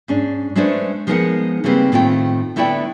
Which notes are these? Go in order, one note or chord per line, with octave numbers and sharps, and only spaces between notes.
G#2 C#4 D4
G#3 A3 C#4 D4 B4 C5
F3 G#3 B3 D#4 A#4 F#5
C#3 G3 A#3 C4 B4
A2 D#3 A3 C4 F4 G5
D3 A3 B3 E4 D5 G5